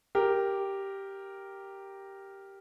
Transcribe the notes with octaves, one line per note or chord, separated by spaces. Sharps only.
G4 A#4